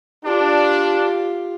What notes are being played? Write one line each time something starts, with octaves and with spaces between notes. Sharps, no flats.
D4 F4 G4